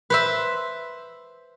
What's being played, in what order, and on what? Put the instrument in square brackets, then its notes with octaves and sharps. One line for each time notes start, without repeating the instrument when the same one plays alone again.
[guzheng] B4 C5 E5